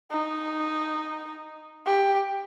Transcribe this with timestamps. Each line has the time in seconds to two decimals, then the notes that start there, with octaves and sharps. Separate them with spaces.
0.11 D#4
1.86 G4